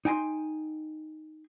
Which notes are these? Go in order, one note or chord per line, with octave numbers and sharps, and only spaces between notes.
D#4 G5 G#5 A#5 C6